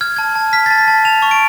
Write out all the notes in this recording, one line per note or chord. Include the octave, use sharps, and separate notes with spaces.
F6 G#6
A5 G#6
A5
F6 B6
A5 A6
B6
A5
A5 F7
C#6
D7